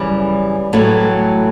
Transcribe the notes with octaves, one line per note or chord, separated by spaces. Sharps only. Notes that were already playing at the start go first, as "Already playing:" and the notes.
Already playing: F#2 C#3 E3 G3
A2 E3 F#3 A3